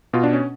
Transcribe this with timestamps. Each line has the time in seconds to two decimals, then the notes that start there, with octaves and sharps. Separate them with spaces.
0.13 B2 F4
0.23 D4
0.33 C#4